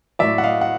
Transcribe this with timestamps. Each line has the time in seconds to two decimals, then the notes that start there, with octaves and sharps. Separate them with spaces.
0.19 A2 F#3 D5 E5
0.38 F#5
0.43 D#5 F5
0.61 F#5